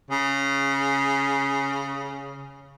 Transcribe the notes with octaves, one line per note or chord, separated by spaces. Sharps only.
C#3 G#4